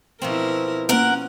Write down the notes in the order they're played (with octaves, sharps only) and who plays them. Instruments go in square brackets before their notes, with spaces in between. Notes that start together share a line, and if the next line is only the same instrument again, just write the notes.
[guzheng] B2 F3 C4 [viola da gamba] E4 A#4
[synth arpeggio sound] A#3 D7 [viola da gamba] C#4 [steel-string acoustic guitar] A#4 F#5